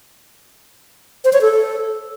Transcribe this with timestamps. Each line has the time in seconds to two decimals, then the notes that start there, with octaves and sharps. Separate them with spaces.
1.25 C5
1.33 C#5
1.41 A4